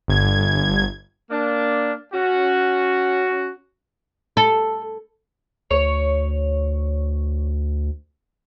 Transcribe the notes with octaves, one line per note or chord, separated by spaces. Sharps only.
G1 G#6
A#3 D4
C#4 F#4
A4
D2 C#5